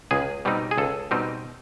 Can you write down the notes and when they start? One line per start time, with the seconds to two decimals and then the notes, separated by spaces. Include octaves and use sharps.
0.11 C#2 G#4
0.45 B2 G3 C4 D#4
0.71 G#4
0.78 C#2 A4
1.11 B2 G3 C4 D#4